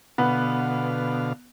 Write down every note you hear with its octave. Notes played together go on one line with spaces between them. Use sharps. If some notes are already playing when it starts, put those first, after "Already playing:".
B2 D3 B3 F5